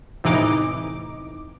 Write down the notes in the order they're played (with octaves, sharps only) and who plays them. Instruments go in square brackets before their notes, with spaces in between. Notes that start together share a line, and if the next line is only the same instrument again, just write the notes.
[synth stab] E2 A2 C3 E3 D#4 D6